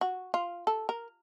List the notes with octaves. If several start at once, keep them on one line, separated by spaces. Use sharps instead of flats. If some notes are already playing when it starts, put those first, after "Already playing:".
F#4
F4
A4
A#4